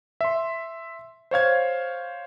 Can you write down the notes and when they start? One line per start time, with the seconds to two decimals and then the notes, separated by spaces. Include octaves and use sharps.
0.21 E5 C6
1.31 C5 C#5 F5 G#6